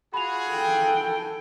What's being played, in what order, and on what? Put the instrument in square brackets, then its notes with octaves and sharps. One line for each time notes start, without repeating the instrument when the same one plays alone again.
[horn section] F4 F#4 G#4 [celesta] B5 F7
[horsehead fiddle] A4 G5